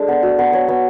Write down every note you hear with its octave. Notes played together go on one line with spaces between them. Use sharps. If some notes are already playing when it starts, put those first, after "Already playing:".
Already playing: G#3 D4 A4
B3
F#4
B3
C#5
B3